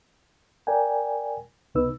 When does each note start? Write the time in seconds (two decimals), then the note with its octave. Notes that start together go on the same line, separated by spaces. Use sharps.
0.67 A#4 D5 G5 G#5
1.75 C#2 C3 B3 D#4 B4 E6